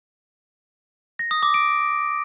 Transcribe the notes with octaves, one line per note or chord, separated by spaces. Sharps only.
A#6
D#6
D6
D7